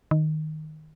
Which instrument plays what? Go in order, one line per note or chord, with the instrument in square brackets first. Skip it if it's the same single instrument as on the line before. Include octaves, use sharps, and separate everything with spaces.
[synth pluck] D#3